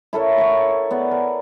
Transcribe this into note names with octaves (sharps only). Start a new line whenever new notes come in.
E4 A4 A#4 C#5
C#5 F#5 C#6
B3 D5
A#4 G#5